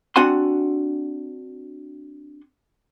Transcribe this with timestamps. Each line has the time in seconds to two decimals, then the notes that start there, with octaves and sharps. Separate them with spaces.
0.16 C4 D4 F#4 F#5 G#5 C6